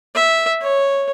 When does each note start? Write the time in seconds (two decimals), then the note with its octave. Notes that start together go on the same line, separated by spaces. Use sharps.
0.15 E5
0.61 C#5